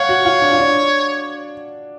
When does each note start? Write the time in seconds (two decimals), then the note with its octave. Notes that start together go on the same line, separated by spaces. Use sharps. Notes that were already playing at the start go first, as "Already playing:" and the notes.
Already playing: C#5 F5 F#5
0.09 F#4
0.25 F4
0.42 D4
0.52 F4
0.59 D4